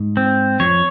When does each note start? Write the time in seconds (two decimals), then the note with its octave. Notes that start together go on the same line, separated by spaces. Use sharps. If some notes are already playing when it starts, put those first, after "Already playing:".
Already playing: G#2
0.17 C4
0.60 F2 C#5